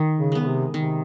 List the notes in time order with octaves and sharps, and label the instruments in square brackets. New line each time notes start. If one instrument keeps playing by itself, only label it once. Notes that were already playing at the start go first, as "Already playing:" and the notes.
Already playing: [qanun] D#3
[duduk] C#3
[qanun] G#3 B3
[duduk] C#3
C3
[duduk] C3 [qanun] D#3